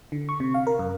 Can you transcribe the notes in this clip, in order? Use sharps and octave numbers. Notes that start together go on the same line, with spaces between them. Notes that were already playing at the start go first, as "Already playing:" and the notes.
D3
C#6
C3
F5
A#4
F#2